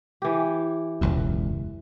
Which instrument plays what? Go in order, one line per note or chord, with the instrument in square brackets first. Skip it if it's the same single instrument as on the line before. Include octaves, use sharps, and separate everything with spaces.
[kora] E3 G4
[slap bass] E1 C#2 F#2